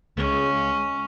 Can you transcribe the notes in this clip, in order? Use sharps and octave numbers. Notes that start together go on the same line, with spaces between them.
C#2 C#3 G#3 C#4